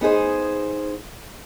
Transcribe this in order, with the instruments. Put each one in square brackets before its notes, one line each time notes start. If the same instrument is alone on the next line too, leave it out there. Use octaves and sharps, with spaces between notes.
[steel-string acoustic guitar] B3 D#4 G#4 C5